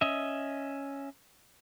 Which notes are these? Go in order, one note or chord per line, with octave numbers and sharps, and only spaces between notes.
C#4 D#5 E5